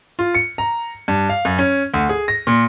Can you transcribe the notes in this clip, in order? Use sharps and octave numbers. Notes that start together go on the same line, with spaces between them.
F4
C#7
A#5
G2
F5
F#2
C#4
D2
G#4
A#6
A#2